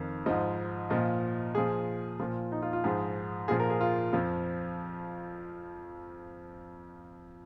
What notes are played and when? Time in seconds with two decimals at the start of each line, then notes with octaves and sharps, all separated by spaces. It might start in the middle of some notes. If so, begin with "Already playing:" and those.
Already playing: F2 D#3 A#4
0.26 G#2 F3 D#5
0.90 A#2 F3 D#5
1.55 A#2 F3 G#4
2.20 A#2 F3
2.52 D#4
2.62 F4
2.73 F4
2.84 G#2 F3 G#4
3.48 A#2 F3 G#4
3.60 A#4
3.70 G#4
3.81 F4
4.13 F2 F3